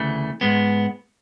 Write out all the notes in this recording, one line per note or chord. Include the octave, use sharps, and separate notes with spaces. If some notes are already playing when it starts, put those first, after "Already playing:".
Already playing: D2 C#3 E3 A3
G#2 G#3 B3